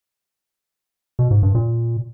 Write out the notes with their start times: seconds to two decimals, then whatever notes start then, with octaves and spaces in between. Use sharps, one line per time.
1.19 B2
1.31 G#2
1.43 G2
1.55 A#2